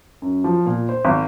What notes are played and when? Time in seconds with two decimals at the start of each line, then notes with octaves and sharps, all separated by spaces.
0.22 F#2
0.44 F3
0.66 A#2
0.89 C5
1.05 G#1